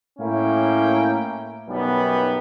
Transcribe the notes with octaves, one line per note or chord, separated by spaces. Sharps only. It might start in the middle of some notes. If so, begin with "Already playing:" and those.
A2 A#3 C#4 E4 G5
B1 F#2 G3 B3